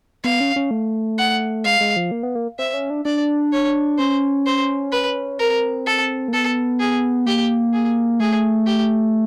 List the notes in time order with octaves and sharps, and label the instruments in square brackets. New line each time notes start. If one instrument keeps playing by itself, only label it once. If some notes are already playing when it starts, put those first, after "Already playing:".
[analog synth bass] B3 [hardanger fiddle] F5
[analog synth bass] C#4
C#4
A3
[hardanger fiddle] F#5
[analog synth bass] G#3 [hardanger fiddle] F5
[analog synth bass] G#3
F3
A#3
B3
A#3
[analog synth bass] C4 [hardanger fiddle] E5
[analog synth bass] C#4
D4
[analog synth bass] D4 [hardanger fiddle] D5
[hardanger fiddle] C#5
[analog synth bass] C#4 [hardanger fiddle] C5
[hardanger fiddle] C5
B4
[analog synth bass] C4 [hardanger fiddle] A#4
[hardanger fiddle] A4
[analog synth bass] A#3
[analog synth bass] B3 [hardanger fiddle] A4
[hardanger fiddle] G#4
[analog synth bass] A#3 [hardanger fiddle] G4
[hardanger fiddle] G#4
[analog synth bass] A3 [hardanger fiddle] G#4
[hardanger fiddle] G4